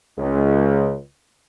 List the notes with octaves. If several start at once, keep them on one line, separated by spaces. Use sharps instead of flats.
C#2